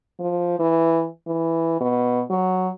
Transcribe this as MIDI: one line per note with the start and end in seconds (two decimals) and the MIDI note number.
0.19 0.55 53
0.59 1.07 52
1.27 1.75 52
1.80 2.23 47
2.30 2.69 54